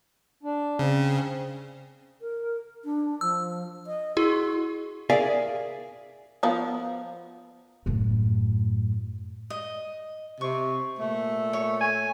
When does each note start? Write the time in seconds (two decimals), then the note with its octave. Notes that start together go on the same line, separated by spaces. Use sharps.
0.43 D4
0.79 C#3 C4
2.21 A#4
2.84 D4
3.21 F3 E6
3.87 D#5
4.17 E4 F#4 G#4
5.10 G#4 A#4 D5 E5 F5 G#5
6.43 F3 B3 A#4
7.86 F#2 A2
9.50 D#5
10.41 C3 C#6
10.99 A#2 A3
11.53 C#5
11.81 G#5